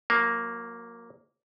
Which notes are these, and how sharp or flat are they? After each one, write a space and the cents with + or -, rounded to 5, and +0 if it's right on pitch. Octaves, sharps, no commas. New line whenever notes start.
F#3 -35 A#3 +0